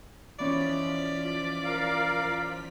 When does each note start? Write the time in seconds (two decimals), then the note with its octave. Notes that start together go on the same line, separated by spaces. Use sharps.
0.39 E3 F3 C#4 D#4 F4 D5 B6
1.65 A#4 F5